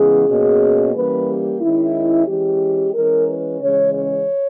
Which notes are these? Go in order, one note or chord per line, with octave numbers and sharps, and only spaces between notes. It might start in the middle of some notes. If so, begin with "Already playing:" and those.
Already playing: C#3 E3 G#3 B3 G#4
B2 A#3 C#4
E3 G3 A#3 C#4 B4
G4
D#3 G#3 C#4 E4
E3 G#3 C#4 G4
E3 G#3 C#4 A#4
B4
C#3 E3 G#3 C#4 C#5
C#5